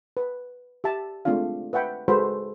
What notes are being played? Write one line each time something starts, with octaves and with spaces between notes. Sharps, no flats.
B4
G4 E5 A5
G#3 A3 C4 D4 F4 F5
B4 E5 F#5 G5 B5
G#3 F#4 A4 B4 C5 B5